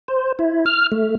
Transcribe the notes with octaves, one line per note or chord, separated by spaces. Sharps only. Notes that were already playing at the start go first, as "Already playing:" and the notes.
C5
E4
F6
A3